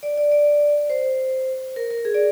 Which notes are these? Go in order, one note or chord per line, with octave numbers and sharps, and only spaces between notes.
D5
D5
D5
C5
A#4
A#4
G#4
D5